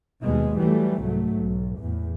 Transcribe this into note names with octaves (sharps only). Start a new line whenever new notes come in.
D#2 B2 G#3
E3 F#3 G3 A3
C2 G#2 F#3 A3
B1
E2 A2